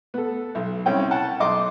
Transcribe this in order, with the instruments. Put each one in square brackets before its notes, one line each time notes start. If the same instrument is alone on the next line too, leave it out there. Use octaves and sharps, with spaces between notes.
[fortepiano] B3 A4
B1
C2 C#4 G5
F#5 G5 A5
B1 D#5 C6 D6